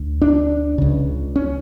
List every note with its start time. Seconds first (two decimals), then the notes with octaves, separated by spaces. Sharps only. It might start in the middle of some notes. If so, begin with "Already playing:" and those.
Already playing: D2
0.22 D4
0.78 C#2 C#3
1.36 C#4